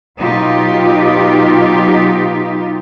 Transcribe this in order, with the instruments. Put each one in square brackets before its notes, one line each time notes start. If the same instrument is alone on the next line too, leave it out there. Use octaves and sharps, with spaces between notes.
[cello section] B2 F#3 D#4 F4 G4